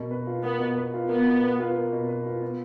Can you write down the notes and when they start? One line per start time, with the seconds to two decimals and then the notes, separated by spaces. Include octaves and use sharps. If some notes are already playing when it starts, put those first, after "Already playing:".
Already playing: B2 A#3
0.11 B4
0.27 F4
0.43 A#3 B3
0.60 B2
0.77 B4
0.94 F4
1.09 A#3 B3
1.27 B2
1.43 B4
1.60 F4
1.76 A#3
1.92 B2
2.08 B4
2.26 F4
2.42 B3